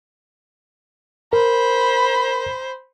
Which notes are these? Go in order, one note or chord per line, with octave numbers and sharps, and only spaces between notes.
A#4 C5 B5